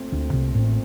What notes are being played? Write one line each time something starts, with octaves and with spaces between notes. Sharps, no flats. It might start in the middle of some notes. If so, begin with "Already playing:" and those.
Already playing: A#2 A3 C4
D2 D3
C2 C3
A1 A2